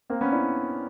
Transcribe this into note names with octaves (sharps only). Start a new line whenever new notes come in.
A#3 C4
B3 C#4
D4 E4